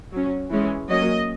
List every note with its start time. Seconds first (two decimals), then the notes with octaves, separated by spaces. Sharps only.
0.13 F#3 C#4
0.50 E3 G#3 C#4
0.89 F#3 A#3 C#4 D#5